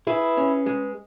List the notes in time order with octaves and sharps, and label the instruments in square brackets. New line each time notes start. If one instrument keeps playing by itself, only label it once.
[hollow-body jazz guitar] E4 [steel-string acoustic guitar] G#4 B4
[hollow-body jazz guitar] C#4
G#3